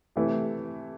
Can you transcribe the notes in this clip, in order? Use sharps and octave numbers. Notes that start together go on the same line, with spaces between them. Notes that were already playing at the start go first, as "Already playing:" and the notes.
C3 E3 A3